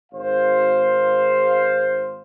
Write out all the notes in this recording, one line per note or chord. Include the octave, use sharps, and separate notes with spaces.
G#1 C5 F5